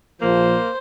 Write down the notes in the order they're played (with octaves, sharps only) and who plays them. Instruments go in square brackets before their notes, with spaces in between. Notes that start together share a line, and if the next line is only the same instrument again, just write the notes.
[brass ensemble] A#1 F3 [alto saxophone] A#3 [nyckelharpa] C5